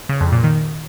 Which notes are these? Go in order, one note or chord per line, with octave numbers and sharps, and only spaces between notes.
C#3
F2
A#2
D#3